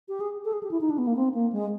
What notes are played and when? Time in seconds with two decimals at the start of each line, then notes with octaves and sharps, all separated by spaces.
0.08 G4
0.20 G#4
0.45 A4
0.53 G#4
0.63 G4
0.71 E4
0.81 D#4
0.90 D4
0.98 B3
1.07 A#3
1.16 C4
1.34 A#3
1.52 G#3